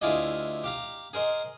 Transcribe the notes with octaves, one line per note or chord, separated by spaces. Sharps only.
D2 E4 F4 G4 G#4 D#5
G4 F5 A#5
G#4 A#4 C5 D#5